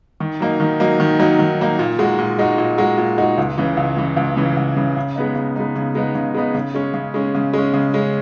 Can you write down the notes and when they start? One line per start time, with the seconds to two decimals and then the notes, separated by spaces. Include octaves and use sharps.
0.20 D#3
0.40 F#3 A#3 D#4
0.60 D#3
0.80 F#3 A#3 D#4
1.00 D#3
1.19 F#3 A#3 D#4
1.39 D#3
1.59 F#3 A#3 D#4
1.79 A#2
1.99 G#3 D#4 F#4
2.19 A#2
2.39 G#3 D#4 F#4
2.58 A#2
2.78 G#3 D#4 F#4
2.98 A#2
3.18 G#3 D#4 F#4
3.38 C#2
3.58 C#3 E3
3.77 C#2
3.97 C#3 E3
4.17 C#2
4.37 C#3 E3
4.57 C#2
4.76 C#3 E3
4.97 C#3
5.16 G#3 B3 D#4
5.36 C#3
5.56 G#3 B3 D#4
5.75 C#3
5.95 G#3 B3 D#4
6.15 C#3
6.34 G#3 B3 D#4
6.54 C#3
6.74 G#3 C#4
6.94 C#3
7.14 G#3 C#4
7.35 C#3
7.53 G#3 C#4
7.74 C#3
7.94 G#3 C#4